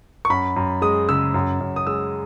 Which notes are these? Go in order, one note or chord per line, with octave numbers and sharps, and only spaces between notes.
C#6
F#2 B5
F#2
G#3 D#6
C#3 E6
F#2
F#2
D#6
G#3 E6